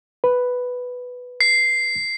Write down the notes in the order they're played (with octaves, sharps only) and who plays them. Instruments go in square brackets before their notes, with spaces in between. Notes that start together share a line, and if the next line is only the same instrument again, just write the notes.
[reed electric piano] B4
[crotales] C7